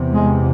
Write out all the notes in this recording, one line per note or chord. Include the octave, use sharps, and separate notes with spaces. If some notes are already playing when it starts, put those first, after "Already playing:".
Already playing: E2 C3
G#3